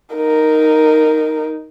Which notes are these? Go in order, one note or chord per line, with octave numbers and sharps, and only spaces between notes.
D#4 A#4